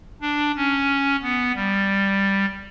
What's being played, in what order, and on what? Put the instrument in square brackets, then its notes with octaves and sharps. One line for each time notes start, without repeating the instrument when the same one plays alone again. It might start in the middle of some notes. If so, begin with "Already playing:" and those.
[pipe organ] D4
C#4
B3
G3